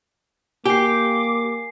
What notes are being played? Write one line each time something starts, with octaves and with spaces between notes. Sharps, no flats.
A#3 G4 G#5 D6 C7